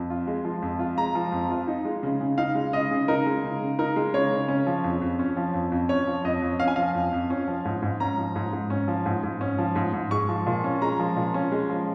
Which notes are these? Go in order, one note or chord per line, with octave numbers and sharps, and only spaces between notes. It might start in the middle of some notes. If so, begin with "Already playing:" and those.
Already playing: F2
F4
G#3
F3
F2
F4
G#3 A#5
F3
F2
F4
D#4
G#3
C#3
C#3
D#4 F5
G#3
C#3 D#5
C#3
D#4 A#4
G#3
C#3
C#3
D#4 A#4
G#3
C#3 C#5
C#3
C#4
F3
F2
F2
C#4
F3
F2
F2
C#4 C#5
F3
F2 D#5
F2
C#4 F5
G#5
F3 F5
F2
F2
C#4
F3
G#2
G#2
C#4 A#5
F3
G#2
G#2
C#4
F3
G#2
G#2
C#4
F3
G#2
G#2
G#3 C#6
F3
A#2
C#4
G#3 A#5
F3
A#2
C#4
G#3
F3